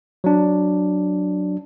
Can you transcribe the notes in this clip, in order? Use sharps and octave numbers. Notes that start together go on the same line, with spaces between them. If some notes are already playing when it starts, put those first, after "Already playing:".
F#3 D4